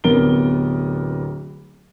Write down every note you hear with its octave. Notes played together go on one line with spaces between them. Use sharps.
D1 C3 B3 A#4 D7 G7